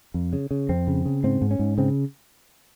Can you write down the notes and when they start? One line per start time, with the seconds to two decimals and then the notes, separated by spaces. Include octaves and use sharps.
0.14 F2
0.33 C#3
0.51 C#3
0.69 F2 C4
0.87 C#3
1.06 C#3
1.24 G#2 C4
1.42 G#2
1.51 C#4
1.59 G#2
1.78 C#3 C4